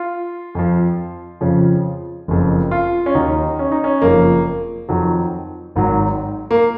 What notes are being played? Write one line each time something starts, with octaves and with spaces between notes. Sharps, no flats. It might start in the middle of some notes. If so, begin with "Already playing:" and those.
Already playing: F4
F2 F3
F2 C#3 F3
F#1 F2 F3
F4
C#4
D#2 D#3 F#3 D#4
C#4
D#4
C#4
F#1 F2 F3 A#3
F2 D#3 F#3
G#1 G#2 D#3 F#3
A#3